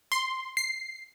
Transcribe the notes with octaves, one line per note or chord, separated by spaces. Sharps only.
C6
C7